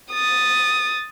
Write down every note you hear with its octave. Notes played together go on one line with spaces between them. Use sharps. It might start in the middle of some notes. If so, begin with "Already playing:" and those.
D#6 A6